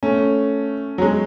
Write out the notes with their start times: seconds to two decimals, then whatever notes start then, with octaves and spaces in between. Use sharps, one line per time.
0.03 A3 C#4
0.98 F#3
1.02 G#3